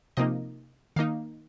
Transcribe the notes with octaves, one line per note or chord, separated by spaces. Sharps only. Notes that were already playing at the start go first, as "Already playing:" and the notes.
C3 F3 A#3 D#4 D#5
D#3 A#3 D#4 F5